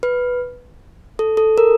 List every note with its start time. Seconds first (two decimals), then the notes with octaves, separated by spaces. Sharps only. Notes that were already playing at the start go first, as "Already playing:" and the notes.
0.03 B4
1.19 A4
1.37 A4
1.58 A#4